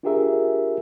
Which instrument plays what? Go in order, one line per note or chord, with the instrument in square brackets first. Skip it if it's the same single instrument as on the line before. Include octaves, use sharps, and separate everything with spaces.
[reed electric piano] D4 F4 G4 G#4 A#4 E5